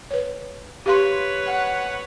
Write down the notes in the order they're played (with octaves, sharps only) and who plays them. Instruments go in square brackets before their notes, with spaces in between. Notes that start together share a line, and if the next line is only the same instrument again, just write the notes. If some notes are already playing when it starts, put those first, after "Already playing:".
[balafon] B4 C#5
[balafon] G4 F5 C6 [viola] B4 C#5
[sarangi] F#5